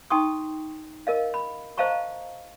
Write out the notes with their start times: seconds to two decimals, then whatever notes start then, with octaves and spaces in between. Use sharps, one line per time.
0.10 D#4 G5 A5 C6 C#6 D#6
1.07 A#4 D#5 F5
1.34 B5
1.78 C5 D#5 F5 A5 A#5 C#6